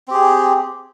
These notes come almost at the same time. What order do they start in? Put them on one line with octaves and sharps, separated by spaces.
C4 G4 G#4